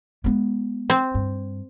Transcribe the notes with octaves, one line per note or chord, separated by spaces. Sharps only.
G#3 B3
C4
G2